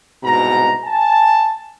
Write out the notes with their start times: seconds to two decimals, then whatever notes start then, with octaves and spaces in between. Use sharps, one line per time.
0.23 C2 G#2 B2 A#5
0.83 G#5 A5